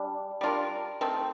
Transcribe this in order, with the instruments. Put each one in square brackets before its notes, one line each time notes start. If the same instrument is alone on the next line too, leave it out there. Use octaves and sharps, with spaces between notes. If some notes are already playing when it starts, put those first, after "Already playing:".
Already playing: [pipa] G3 D4
G3 D4 F4 A#4
D#3 A3 C4